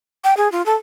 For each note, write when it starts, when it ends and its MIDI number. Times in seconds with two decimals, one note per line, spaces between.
0.24 0.37 79
0.37 0.51 68
0.52 0.64 65
0.66 0.75 69